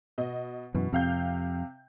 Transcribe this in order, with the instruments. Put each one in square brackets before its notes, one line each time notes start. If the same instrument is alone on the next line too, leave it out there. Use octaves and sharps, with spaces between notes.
[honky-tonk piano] B2 D#5
[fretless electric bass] F#2 E3 [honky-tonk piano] B2
[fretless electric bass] F2 [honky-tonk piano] C3 F5 G6